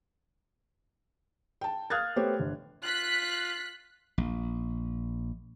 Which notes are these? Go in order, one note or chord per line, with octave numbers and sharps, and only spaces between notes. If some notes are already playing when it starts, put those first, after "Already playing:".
G5 A5
F5 D#6 F6 F#6 G#6 A6
A3 B3 G4 C5 C#5
G1
F4 F#6 B6
A#1